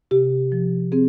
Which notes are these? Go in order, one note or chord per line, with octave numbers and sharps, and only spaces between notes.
C3 G4
F3
C4 G#4